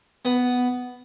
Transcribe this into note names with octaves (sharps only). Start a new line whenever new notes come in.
B3